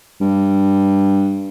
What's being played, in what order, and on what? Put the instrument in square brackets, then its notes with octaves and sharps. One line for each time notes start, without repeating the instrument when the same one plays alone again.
[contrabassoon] G2